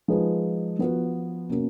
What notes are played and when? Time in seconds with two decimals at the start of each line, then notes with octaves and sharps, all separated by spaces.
0.08 F3 G#3 D#4 G#4 B4
0.79 F3 B3 F#4 B4
1.49 B2 A#3 C#4